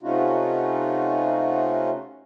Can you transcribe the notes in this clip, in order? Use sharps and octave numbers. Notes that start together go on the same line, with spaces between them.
C3 A3 C#4 D#4 F4 F#4